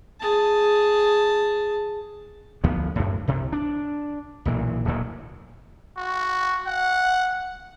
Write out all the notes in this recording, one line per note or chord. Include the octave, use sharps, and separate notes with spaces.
G#4 A5
D2 F3 B3
F#2 A2
C2 C3
D4
B1 A#2 E3
D1 D2 A#2 F#3
F#4
F#5